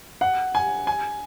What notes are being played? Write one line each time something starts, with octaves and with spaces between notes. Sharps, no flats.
F#5
G#5
G#5